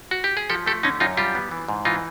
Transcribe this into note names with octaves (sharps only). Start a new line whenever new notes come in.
F#4
G4
G#4
F3 G4 A4
A3 G4 A4
D3 C#4 D#4
F#2 D#4 F4
G3 F4 G4
B3
E3
G#2
E3 D#4 F4